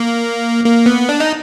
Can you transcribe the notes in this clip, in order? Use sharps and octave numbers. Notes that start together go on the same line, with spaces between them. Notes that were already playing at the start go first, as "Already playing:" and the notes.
Already playing: A#3
A#3
B3
D4
D#4